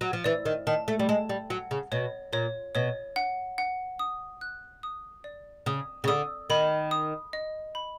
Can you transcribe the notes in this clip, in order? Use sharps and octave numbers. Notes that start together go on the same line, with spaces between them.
F#3
F3
E3 D5
D#3
D#3 A5
A3
G3
G#3 A5
G3
F#3 F#5
C#3
B2 C#5
A#2 C#5
B2 C#5
F#5
F#5
D#6
F#6
D#6
D5
C#3 D#6
C#3
D3 D#6
D#3 B5
D#6
D#5
B5